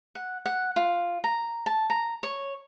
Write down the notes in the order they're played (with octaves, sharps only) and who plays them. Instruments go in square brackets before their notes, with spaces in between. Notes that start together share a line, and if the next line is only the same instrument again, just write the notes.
[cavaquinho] F#5
F#5
F4
A#5
A5
A#5
C#5